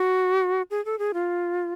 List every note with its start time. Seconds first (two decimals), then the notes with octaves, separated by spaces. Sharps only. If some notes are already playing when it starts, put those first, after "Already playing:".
Already playing: F#4
0.71 G#4
0.85 A4
0.99 G#4
1.14 F4